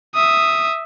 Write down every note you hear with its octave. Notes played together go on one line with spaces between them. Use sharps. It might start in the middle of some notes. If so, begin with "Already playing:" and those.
E5 D#6